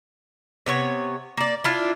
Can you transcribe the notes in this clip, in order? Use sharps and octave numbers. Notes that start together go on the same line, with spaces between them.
C3 B3 C#5
A#3 D5
D4 E4 F4